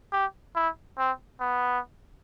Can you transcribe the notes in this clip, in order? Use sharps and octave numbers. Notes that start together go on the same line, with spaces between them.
G4
E4
C4
B3